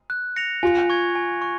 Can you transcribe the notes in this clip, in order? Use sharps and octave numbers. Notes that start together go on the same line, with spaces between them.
F#6
A#6 C#7 F7
F4 G#5
C#6 G#6
G#5
C#6